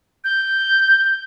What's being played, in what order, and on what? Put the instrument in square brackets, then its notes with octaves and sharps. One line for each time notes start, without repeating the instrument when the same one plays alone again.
[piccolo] G6